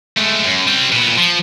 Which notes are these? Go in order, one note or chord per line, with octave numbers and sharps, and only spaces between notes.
G#3 A3
F#2
G3 C4
A#2 B3
F3